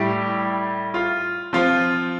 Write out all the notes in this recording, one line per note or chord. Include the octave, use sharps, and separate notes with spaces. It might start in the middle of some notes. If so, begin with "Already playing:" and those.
Already playing: A2 G3 E4 G4
F4
F3 C4 F4